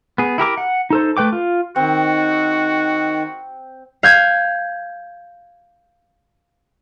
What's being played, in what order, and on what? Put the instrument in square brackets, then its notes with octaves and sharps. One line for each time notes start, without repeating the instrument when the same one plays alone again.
[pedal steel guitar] B3 G#4
E4 G4 A#4 D6
F#5
D#4 A4 C5
A3 B4 G5 D6
F4
[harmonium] D#3 [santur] C4 [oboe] F#4
[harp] F5 G6 G#6